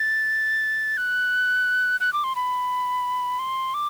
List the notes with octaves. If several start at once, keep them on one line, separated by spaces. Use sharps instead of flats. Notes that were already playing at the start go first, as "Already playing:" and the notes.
Already playing: A6
F#6
F#6
D6
C6
B5
C6
D6